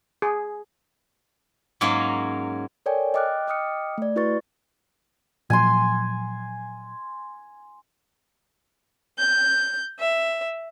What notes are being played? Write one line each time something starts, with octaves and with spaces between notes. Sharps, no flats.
G#4
G#2 F#3 A#3 C#4 F5
A4 A#4 C#5 D5 G5 G#5
D#5 G5 D6 F6 F#6
D#5 G5 D6 D#6 F6 C#7
A3 D5
E4 F#4 B4 D5 C#6 A6
A#2 F3 F#3 G#5 C6
G6
E5